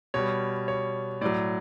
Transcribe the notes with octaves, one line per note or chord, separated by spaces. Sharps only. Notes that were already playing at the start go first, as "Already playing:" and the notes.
B2 G3 C#5
C#5
A2 F#3 D5